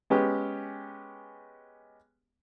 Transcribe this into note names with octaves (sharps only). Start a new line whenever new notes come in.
G#3 B3 C#4 G4